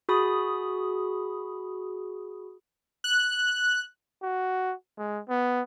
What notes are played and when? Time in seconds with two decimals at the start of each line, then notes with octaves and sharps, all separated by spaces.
0.09 F#4 G#4 B5 D#6
3.04 F#6
4.23 F#4
4.98 G#3
5.29 B3